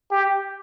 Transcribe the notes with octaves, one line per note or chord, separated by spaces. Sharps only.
G4